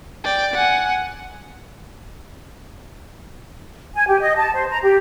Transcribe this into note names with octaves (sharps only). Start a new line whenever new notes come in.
D5 G5
F#5 G#5
G#5
G4
D#5
A5
C5
A#5
G4